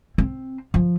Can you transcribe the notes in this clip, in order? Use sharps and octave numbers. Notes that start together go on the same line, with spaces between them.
C4
F3